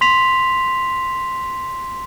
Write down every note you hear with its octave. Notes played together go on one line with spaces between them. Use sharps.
C6 B6 F7